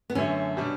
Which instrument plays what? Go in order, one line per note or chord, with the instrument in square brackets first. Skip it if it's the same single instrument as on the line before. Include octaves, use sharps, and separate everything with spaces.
[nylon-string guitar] B3
[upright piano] F#2 D3 A3 [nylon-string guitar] C#4
[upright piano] B2 G3 D4